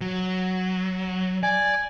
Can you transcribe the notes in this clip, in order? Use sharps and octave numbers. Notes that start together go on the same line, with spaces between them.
F#3
D5 G#5